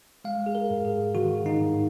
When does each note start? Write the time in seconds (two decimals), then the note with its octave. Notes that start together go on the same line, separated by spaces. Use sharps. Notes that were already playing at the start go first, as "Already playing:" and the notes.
0.25 G#3 F5
0.46 G#4
0.55 A#4
0.70 G#2
0.85 G#4
1.15 D#3 F#4
1.46 D#4
1.60 G#2